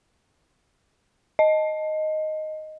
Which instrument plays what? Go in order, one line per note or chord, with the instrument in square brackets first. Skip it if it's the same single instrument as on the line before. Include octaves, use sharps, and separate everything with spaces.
[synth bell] D#5